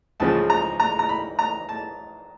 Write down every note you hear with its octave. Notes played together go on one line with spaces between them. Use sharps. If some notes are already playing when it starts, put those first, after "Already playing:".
C#2 C#3 F3 A5
A#5
A#5
A#5
B5
A#5
A5